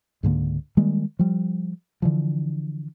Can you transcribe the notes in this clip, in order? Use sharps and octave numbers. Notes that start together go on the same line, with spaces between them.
C#2 G#2 D3 A#3
D#3 G3 G#3 A#3
F3 G3
D3 E3 F3